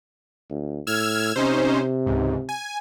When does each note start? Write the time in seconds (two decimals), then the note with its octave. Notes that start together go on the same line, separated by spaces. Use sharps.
0.50 D2
0.87 A2 E6 F6 G#6
1.36 C3 C#4 D#4 C5
2.06 C#2 G#2
2.49 G#5